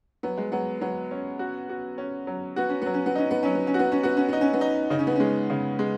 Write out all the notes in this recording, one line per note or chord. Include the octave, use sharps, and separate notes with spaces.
F#3 B3
G#3
F#3 B3
F#3 B3
C#4
F#4
F#4
C#4
F#3
B3 F#4
C#4
F#3 B3
C#4
B3
C#4 D#4
B3
F#3 C#4
B3
C#4
F#4
B3
C#4
B3 F#4
C#4
B3 D#4
C#4
B3
D#4
C#3 D#4
C#4
B3
G#3 C#4
C#3
G#3